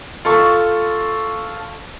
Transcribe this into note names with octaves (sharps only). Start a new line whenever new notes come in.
F4 A4 C#6